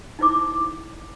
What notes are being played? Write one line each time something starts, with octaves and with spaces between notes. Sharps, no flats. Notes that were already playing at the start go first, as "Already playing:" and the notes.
D#4 E4 C5 D6